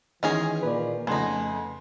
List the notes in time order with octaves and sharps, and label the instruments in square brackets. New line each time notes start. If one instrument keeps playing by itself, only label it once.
[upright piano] D#3 [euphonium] E3 [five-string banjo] G#3 C#4 G#4
[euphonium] A#2 [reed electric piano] B4 D5
[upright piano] F2 C#3 [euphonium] A3 [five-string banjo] B3 D#4 [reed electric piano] G#5 C6